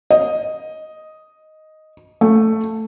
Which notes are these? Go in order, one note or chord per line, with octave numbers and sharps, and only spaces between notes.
D#5
A3